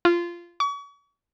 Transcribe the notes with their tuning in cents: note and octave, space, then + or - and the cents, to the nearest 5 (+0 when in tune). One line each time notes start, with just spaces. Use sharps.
F4 -15
C#6 +40